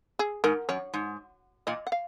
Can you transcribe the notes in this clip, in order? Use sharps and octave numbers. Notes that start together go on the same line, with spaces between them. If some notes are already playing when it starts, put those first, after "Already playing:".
G#4
G#2 A#4
F#2 C#5
G#2
A#2 D#5
F#5
F5